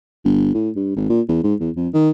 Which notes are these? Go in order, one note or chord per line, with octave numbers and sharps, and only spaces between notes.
G1
A2
G2
G#1
A#2
E2
G#2
E2
F2
D#3